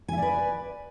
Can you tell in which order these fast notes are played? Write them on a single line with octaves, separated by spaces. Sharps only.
G#5 E5 D5 B4